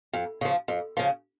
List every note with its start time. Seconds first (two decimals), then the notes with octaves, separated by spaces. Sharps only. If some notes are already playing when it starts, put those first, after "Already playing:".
0.13 F2
0.41 C#3 F3
0.68 F2
0.97 C#3 F3